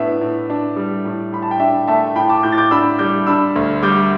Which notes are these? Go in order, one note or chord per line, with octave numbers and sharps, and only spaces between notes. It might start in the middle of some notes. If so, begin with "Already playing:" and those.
Already playing: A2 B3 D4 E5
A2
D4
G3
A2
A2 B5
A5
G5
D4 E5
A3 E5 A5
A2 G5 B5
A5 D6
A2 D6 G6
A6
D6 G6
D4 B5 E6
G3 D6 G6
D4 B5 E6
D2
G3 D6 G6